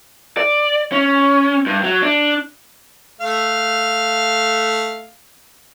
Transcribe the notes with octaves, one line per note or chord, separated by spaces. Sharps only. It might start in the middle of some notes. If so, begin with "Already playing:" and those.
D5
C#4
G2
F#3
D4
A3 F5